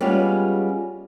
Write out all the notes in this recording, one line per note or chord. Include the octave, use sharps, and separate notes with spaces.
G3 G#3 B3 C#4 F4 G#4